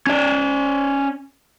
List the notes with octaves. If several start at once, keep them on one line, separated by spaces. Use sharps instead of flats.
C#4 D5